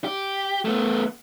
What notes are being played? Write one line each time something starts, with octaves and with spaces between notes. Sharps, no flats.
G4
A3 B3